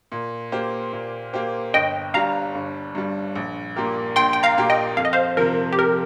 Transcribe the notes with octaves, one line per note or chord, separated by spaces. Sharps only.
A#2
A#3 G4 C5
A#2
A#3 G4 C5
G1 D#5 G5
G2 G3 F5 A#5
G1
G2 G3
A#1
A#2 A#3 G4 A#4
A#1 G5 C6
G5
F5 A#5
A#2 A#3 G4 A#4
D#5 G5
F2 F5
D#5
C5 F5
C3 F3 A#4
G4
F2 A#4